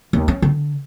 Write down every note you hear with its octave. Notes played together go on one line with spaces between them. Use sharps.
D#2
C#4
D3